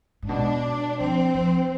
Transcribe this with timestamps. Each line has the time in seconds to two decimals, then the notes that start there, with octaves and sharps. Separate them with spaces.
0.22 G#2
0.29 B2 D4
0.99 F3 C4
1.34 F3